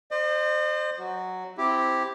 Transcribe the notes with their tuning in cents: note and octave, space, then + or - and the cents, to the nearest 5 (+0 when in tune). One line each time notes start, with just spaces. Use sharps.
C5 +0 D#5 -45
F#3 +0 F#4 +0
C4 -5 E4 +0 G4 +0